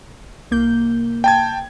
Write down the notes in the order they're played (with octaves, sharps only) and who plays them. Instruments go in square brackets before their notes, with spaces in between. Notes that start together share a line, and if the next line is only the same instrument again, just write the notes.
[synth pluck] C2 A#3 G6
[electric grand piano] G5 A5 G#6